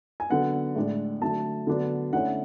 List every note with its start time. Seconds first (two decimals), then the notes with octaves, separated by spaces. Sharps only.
0.20 G#5
0.30 D3 F#3 B3 F#5
0.76 A2 G#3 D4
1.22 D3 F#3 A3 A5
1.67 D3 F#3 B3 D4
2.13 D3 A3 C#4 E4 F#5